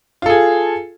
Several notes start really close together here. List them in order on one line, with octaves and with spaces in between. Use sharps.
F4 A4 G#4